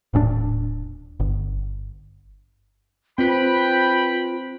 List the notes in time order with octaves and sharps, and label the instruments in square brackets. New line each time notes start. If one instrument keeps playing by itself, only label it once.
[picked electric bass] D#1 A2 C4 D4
G1
[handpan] C4 [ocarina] F4 [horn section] B4 G5 B5